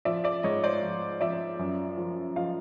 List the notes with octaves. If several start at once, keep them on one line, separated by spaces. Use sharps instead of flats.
F3 D5 E5
D5 E5
G#2 C#5 D#5
C5 D5
F3
F3 D5 E5
F#2
F3
F3 D#5 F5